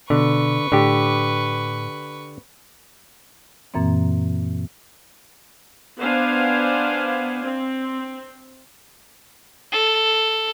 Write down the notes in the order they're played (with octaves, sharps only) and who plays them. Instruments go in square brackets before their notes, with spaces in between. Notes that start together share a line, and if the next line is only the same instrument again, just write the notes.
[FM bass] B2 [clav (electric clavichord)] D3 [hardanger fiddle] B4 C#6
[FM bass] A2 [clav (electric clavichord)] D3 G4
[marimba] F#2 A#2 E3 A#3 C4
[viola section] B3 D4 C5 F5 G#5
C4
[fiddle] A4